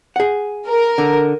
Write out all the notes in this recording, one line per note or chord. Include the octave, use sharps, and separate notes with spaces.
G#4 F#5
A#4
D3